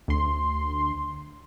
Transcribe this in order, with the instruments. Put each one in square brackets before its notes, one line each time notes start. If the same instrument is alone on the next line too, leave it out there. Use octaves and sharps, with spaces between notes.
[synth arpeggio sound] D2 C6